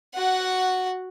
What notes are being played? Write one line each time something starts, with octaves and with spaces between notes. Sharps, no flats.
F#4 F#5